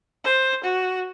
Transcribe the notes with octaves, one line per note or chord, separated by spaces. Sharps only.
C5
F#4